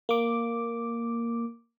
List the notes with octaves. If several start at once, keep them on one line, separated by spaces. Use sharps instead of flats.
A#3 D6